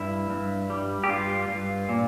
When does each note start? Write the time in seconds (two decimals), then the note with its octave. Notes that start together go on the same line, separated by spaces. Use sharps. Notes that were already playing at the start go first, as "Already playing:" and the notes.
Already playing: G2 E4
0.30 G2
0.70 G3
1.04 G4
1.09 G2 F4
1.48 G2
1.89 A#2